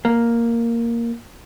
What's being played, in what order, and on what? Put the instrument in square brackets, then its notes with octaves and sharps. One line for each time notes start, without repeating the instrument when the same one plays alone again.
[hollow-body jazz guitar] A#3